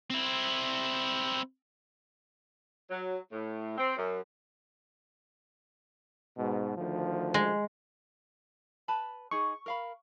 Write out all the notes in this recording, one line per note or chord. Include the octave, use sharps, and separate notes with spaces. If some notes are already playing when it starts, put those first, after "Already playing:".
C4 E4
F#3
A2
C4
F#2
G#2 B2
D2 D#3 F3
G#3
B4 A5 B5
D#4 G#4 C#6
A#4 F5 B5